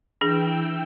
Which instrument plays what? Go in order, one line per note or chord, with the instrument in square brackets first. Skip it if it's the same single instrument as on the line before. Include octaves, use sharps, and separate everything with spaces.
[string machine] E3 G5 E6 [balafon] D4 G#4